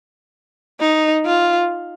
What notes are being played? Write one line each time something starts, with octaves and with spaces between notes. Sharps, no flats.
D#4
F4